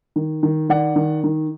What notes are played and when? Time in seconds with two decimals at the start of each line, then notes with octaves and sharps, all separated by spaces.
0.16 D#3
0.43 D#3
0.69 D#3 D5 F#5
0.96 D#3
1.24 D#3